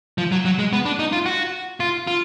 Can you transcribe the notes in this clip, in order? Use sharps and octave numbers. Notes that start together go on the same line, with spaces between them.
F3
F#3
F#3
G#3
B3
D4
D#4
F4
F#4
F4
F4